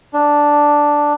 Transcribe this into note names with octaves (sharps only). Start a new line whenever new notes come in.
D4